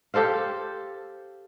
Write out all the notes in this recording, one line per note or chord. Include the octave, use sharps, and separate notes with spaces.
G4 A4 C5 F5